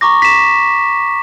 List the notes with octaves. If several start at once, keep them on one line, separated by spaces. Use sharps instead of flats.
A#5 C#6 D6 A#6
B6 E7